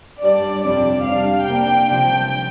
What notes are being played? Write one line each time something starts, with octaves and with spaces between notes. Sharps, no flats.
G2 G3 D4 D5
F2 C3 G3 D4 D5
C3 G3 D4 F5
C3 A#3 D4 G5
C2 C3 F3 D4